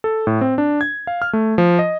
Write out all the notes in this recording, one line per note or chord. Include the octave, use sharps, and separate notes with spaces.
A4
A2
C4
D4
G#6
F5
F6
A3
F3
D#5